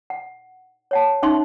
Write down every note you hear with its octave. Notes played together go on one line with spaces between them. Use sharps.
F#5
C#5 F#5 A5
C#4 D#4 E5 C6 C#6